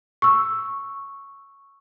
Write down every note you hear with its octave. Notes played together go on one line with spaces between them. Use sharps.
C#6 E6